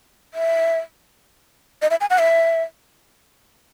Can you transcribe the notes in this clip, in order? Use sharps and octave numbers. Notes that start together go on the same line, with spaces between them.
E5
D#5
E5
G#5
F#5
E5